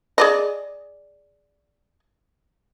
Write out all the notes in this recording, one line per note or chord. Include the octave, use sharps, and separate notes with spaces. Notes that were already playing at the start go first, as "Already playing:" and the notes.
G#4 D5 D#5